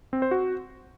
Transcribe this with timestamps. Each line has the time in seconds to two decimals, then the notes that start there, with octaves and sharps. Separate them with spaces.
0.13 C4
0.22 C5
0.31 F#4